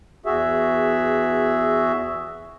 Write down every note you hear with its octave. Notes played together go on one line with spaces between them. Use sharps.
E2 F#4 G#4 E5